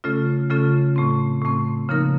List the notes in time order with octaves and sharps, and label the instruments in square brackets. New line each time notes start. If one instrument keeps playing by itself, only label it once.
[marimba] C#3 A3 C#4 F4 A4
C#3 A3 C#4 F4 A4
A2 A3 C4
A2 A3 C4
C#3 F3 A#3 D#4 A#4